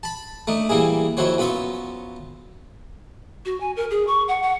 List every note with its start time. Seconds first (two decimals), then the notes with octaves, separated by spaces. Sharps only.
0.03 A5 B5
0.47 A3 D4 D#4
0.69 E3 G3 A#3 E4 G#4
1.17 F2 D#3 E4 F#4 C5 C#5
1.38 F#2 B3 F4 E5 C#6
3.46 F#4
3.60 G#5
3.76 A#4
3.91 G#4
4.07 C#6
4.28 F#5
4.42 F#5